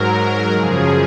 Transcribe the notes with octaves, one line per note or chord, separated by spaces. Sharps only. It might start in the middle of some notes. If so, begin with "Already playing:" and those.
Already playing: G#2 F#3 A#4
F#2 C#3 F3 G#4